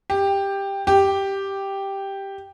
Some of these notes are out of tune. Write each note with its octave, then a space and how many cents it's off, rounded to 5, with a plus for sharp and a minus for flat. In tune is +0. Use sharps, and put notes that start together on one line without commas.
G4 +10
G4 +0